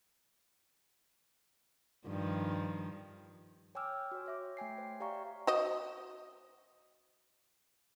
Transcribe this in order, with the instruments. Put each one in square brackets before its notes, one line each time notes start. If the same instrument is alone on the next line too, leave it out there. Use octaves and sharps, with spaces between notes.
[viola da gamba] G2 D#3 F3
[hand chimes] C#5 G5 G#5 D6 E6 F6
F#4 C#5
C#5 E5 D6
A3 G5 G#5 C7
C5
G4 D5 F5 G5 A#5 C#6
[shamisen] F#4 C5 D#5